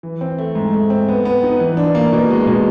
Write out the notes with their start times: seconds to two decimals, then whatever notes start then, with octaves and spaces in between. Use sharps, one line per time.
0.03 E3
0.21 C4
0.38 A3
0.55 G#2
0.74 A3
0.90 C4
1.09 B3
1.25 B3
1.43 D#4
1.60 E3
1.77 D4
1.95 A#3
2.13 B2
2.30 G#3
2.47 B2